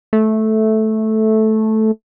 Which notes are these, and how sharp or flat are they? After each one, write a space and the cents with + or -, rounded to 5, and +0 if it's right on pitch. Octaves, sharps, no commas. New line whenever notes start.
A3 -10